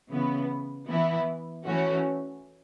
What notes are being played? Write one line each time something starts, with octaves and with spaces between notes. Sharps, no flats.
C#3 E3 B3
E3 B3 E4
E3 A3 C#4 F#4